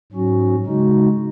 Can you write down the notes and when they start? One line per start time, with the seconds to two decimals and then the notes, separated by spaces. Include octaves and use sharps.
0.12 G#2 F#3 C#4 F#4
0.65 C#3 G#3 D#4 F#4